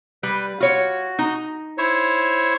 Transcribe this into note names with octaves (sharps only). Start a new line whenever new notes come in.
G3 B4
F4 F#4 C#5
D#4
E4 C5 C#5